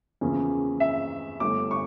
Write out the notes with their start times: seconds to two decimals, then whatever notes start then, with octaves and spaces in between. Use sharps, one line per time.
0.21 E2 C#3 F3 A#3 C#4
0.80 E5
1.40 G1 G2 D3 A3 D6
1.71 C#6